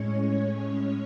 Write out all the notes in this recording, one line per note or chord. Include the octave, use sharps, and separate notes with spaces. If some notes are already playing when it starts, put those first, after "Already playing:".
Already playing: A2 G#3 C#4 C#5
C#5